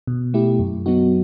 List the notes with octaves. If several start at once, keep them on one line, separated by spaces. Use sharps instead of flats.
B2
A3 E4 G4
F#2
F#3 B3 D#4 F#4